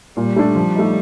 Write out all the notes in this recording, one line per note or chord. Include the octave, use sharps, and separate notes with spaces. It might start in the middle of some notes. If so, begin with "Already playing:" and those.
A#2 G3
A3 D4
F3
A3 D#4